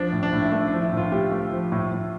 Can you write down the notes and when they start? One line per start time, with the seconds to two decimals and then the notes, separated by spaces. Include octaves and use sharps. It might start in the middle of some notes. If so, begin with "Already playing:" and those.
Already playing: F3 D4
0.12 A2
0.23 D4
0.33 A2
0.42 E4
0.52 A3 D4
0.67 D4
0.72 F3
0.82 E4
0.93 A2 F4
1.12 A2 G4
1.32 A3
1.52 F3
1.72 A2
1.92 A2